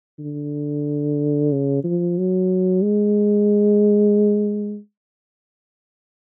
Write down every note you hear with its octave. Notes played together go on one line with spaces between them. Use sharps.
D3
C#3
F3
F#3
G#3